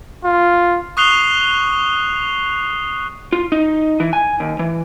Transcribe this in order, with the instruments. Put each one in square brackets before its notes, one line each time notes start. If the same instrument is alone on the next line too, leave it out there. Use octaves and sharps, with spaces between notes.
[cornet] F4
[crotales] C#6 D#6 F#6 C7 F7 G7
[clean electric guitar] F4
D#4
E3
G#5
D#2
E3